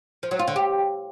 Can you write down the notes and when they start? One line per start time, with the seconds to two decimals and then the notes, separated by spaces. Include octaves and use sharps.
0.23 F3
0.31 F#3
0.39 F4
0.48 D3
0.56 G4